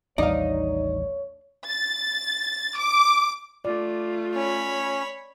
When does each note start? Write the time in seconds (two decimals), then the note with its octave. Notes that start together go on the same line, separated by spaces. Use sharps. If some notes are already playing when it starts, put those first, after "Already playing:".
0.18 A1 D#2 G3 D#4 C#5 D5 F5
1.70 A6
2.77 D6
3.65 A3 F4 D5
4.36 C#4 C#5 B5